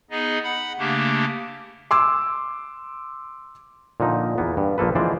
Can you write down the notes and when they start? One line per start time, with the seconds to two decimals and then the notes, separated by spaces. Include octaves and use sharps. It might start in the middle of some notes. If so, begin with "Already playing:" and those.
0.11 B3 D#4 G#4 D#5
0.44 F#5 B5
0.78 C#3 A3 A#3 D4 G4
1.91 C6 D6 E6
4.00 A#2 D3 F3 D#4
4.38 E2 A#3 B3
4.57 G2
4.78 A#1 F3 A#3 A4 B4
4.95 D3 E3 F3 G#3 C5 D5